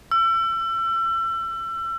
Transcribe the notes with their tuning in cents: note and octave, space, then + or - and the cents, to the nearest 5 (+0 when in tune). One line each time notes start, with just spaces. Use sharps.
E6 +35